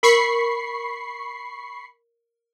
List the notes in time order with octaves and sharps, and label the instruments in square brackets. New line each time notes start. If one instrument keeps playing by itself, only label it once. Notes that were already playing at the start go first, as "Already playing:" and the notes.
[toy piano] A#4 [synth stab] B5 C#6 C7